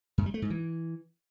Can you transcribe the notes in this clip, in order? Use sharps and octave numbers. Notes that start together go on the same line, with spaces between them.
F#2
G3
A3
G#2
E3